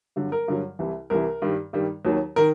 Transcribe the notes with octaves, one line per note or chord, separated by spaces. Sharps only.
G2 D3 F#3
A#4
G2 D3 F#3
C2 C3 E3
C2 C3 E3 A#4
G2 D#3 G3
G2 D#3 G3
D#2 D#3 F#3
D#3 A#4